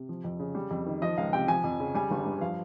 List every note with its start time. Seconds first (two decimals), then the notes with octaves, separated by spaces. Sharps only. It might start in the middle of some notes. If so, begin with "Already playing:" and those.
Already playing: C3
0.09 F3
0.24 F2
0.39 C#3
0.55 G3
0.71 F2
0.86 D#3
1.02 F3 D#5
1.18 C#2 F5
1.33 C3 G5
1.48 F3 G#5
1.64 F2
1.80 C#3
1.94 G3 G#5
2.11 G1
2.25 G2
2.41 F3 F5